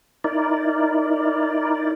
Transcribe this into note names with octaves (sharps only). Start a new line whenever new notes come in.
D#4 E4 A#4 D5